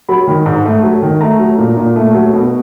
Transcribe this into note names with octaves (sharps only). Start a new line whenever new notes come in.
F#3 B5
D#3
G#2
A3
F#3
D#3
A3 A#5
F#3
A#2
A#2
A3
F#3
B2